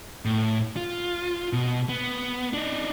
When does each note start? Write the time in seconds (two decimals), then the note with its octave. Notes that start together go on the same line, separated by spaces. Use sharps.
0.25 A2
0.76 F4
1.53 B2
1.89 B3
2.53 D4 D#4